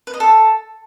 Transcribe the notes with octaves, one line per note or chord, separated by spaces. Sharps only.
B4
D#5
A4